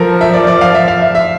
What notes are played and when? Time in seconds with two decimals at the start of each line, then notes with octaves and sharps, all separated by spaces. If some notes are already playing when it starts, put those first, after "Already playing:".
Already playing: F3 A4 A#4
0.21 E5
0.33 D5
0.47 D5
0.61 F5
0.74 E5
0.88 F5
1.02 E5
1.15 E5